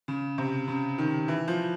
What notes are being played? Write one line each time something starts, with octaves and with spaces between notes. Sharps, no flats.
C#3
C3
C#3
D#3
E3
F3